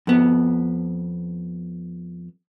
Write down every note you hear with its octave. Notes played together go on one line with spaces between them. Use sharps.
F2 B3